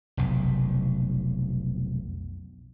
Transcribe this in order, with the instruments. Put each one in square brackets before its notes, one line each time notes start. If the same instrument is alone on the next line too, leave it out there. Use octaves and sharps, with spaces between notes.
[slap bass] F1 B1